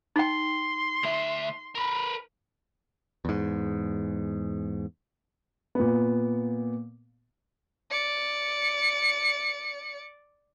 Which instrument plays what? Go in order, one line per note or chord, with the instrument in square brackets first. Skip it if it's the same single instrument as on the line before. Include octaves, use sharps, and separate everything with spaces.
[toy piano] D#4 G5 [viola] C6
[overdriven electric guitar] D2 E5
A#4 B4
[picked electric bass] E2 G#2
[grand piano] A#2 B3
[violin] D5 C#7